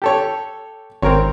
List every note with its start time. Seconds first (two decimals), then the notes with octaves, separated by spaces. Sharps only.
0.02 G4 A4 C#5
1.02 G#1 C4 A#4 C#5